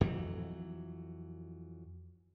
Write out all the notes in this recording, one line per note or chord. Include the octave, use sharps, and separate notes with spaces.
F2 E3 F#3